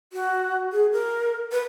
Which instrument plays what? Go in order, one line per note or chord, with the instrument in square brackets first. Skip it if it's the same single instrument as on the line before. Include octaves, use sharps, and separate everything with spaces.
[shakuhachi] F#4
G#4
A#4
B4